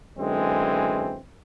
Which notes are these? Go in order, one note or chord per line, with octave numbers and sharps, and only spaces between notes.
F#2 D3 E3 G#3 C4